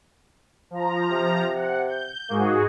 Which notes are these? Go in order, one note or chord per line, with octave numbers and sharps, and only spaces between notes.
F3 A#5
C3
F#5
G6
G#2 A#3 F#4 G#4